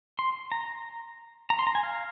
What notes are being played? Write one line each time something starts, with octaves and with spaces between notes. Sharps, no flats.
C6
A#5
A#5
C6
A#5
G#5
F5